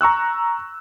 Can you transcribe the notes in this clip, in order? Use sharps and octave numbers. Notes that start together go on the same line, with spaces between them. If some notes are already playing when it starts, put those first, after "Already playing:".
A#5 C#6 E6 F#6